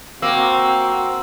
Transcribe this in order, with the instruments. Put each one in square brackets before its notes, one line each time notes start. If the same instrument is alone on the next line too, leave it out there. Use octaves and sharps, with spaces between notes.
[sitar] A#3 [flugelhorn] C4 [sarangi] F#4 [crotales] E6